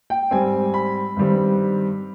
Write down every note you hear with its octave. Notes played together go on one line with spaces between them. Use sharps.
G5
G#2 G3 C4 G#5
B5
G2 D#3 G3 C4